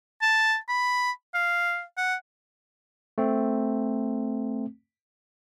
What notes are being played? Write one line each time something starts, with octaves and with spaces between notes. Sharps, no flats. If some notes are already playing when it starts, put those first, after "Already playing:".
A5
B5
F5
F#5
A3 C4